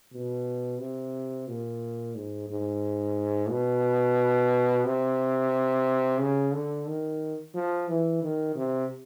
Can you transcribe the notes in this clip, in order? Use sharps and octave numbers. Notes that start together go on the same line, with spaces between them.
B2
C3
A#2
G#2
G#2
B2
C3
C#3
D3
D#3
F3
E3
D#3
C3